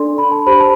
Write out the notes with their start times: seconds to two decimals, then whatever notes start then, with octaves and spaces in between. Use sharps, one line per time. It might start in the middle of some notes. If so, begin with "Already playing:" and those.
Already playing: D4 A4 D5 C6
0.18 B5
0.32 A5
0.47 G4 C5 B5
0.60 A5